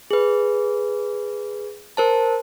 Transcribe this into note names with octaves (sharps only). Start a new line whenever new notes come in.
G#4 B4
A#4 C5 A5